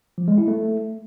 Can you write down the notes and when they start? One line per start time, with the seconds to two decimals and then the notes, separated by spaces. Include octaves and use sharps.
0.18 F3
0.28 G#3
0.38 E4
0.48 A3